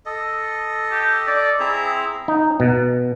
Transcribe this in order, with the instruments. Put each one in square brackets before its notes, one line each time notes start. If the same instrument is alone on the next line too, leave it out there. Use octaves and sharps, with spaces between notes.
[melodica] A4 D#5
[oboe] G4
D5
[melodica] C4 G#4 A#5 [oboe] E4
[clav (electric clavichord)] D#4
B2